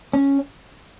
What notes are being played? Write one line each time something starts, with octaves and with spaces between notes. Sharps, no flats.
C#4